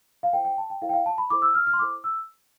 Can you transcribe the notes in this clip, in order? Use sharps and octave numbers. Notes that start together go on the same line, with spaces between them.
F5
E4 A4 C5 G5
G5
A5
G5
E4 A4 C5 F5
G5
F5
A5
B5
E4 A4 C5 D6
E6
F6
F6
C6
E4 A4 C5 D6
E6